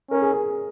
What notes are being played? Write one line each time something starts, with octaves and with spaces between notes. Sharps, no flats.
C#4 A#4
G#4
G#4